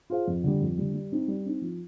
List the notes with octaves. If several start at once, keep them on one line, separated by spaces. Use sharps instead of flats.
F4 G#4 C5 F5
F2
D3 G3
F2
D3 G3
G3
C4 D#4
G3
C4 D#4
F3